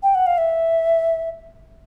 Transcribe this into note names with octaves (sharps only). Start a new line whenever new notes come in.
G5
F#5
F5
E5